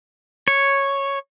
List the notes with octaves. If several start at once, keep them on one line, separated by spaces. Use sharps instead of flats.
C#5